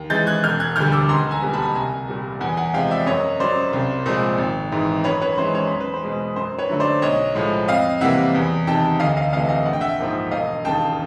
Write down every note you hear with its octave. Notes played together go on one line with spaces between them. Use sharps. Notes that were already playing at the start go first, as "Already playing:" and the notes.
Already playing: D#2
C#3 E3 G#3 G6 A6
F#6 G#6
E1 F6 G6
F#6 G#6
D2 D3 G3 F6 G6
D6 E6
C#2 A#5 C6
G#5 A#5
B2 G3 A#3
A5 B5
C2 G#5 A#5
A#2 G3
E2 F#5 G#5
F#5 G#5
C3 F3 G#3 F5 G5
D5 E5
F#2 C#5 D#5
C#3 F#3 C5 D5
C2
A#2 F3 G#3
G#1
G#2 E3
F#2 B4 C#5
B4 C#5
C#3 E3 G#3 C5
C#5
E2 C5
B4
C5
B2 G#3
F#2 C5
B4 C#5
D3 F#3 A3
C5 D5
B1 C#5 D#5
A2 F3 G#3
F2 D#5 F5
C3 E3 G3 A#3 E5 F#5
E2
C3 D#3 G5 A5
D2 D#5 F5
D#5 F5
C3 E3 A3 D#5 F5
D#5 F5
A#1 F#5
G5
E5 F#5
G#2 F3 A#3
E1 D#5 F5
D#2 C#3 G5 A5